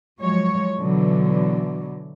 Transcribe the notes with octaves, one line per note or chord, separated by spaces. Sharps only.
F3 F#3 G#3 C#5
B2 D3 E3 F#3